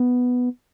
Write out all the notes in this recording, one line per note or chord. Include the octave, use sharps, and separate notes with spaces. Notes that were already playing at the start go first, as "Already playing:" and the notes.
Already playing: B3